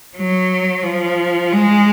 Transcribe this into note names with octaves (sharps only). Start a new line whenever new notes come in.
F#3
F3
G#3